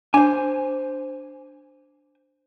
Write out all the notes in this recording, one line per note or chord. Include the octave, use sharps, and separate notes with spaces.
D4 C5 G#5